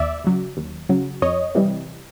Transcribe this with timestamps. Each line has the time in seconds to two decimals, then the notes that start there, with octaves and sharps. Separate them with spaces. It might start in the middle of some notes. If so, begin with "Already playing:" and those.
Already playing: D#2 D5 E5
0.24 C#3 F#3
0.57 D#2
0.89 C#3 F#3
1.22 F2 C#5 D#5
1.55 C3 E3 G3